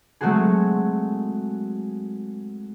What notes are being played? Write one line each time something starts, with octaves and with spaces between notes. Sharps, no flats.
F#3 G#3 A3 C4 F#4 G#4